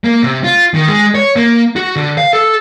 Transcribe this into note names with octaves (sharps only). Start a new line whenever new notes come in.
A#3
C3
F4
D#3
G#3
C#5
A#3
F#4
D3
F5
A4